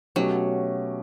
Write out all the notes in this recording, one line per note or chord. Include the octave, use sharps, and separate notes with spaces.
B2 F#3 A3 C#4 G4